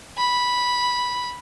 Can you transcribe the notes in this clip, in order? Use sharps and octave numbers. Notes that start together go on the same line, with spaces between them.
B5